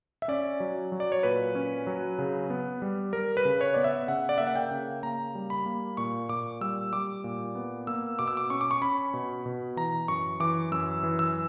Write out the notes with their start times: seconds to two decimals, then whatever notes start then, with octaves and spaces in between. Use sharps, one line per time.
0.22 E5
0.28 C#4 D5
0.60 F#3
0.92 F#3
1.00 D5
1.12 C#5
1.23 A#2 B4
1.55 C#4
1.87 F#3
2.19 C#3
2.50 B3
2.82 G3
3.13 G3 A#4
3.37 B4
3.45 C#3
3.61 C#5
3.74 B3 D5
3.84 E5
4.08 C#3 F#5
4.29 D5
4.38 A#3 E5
4.47 F#5
4.56 G5
4.71 C#3
5.03 A#3 A#5
5.35 G3
5.50 B5
5.66 A#3
5.97 A#2 C#6
6.29 A#2 D6
6.61 G3 E6
6.93 G3 D6
7.24 A#2
7.55 B3
7.87 A#3 E6
8.19 B2 D6
8.28 E6
8.37 D6
8.50 C#4 C#6
8.61 D6
8.71 C#6
8.82 C#4 B5
9.14 B2
9.46 B2
9.77 E3 A#5
10.08 F#2 C#6
10.40 E3 D6
10.72 F#2 E6
11.03 E3
11.19 E6